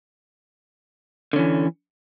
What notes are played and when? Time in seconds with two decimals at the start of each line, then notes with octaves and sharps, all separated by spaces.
1.33 D3
1.36 C#4
1.39 E3